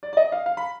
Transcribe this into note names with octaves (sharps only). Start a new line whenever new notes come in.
D5
D5
D#5
F5
F5
B5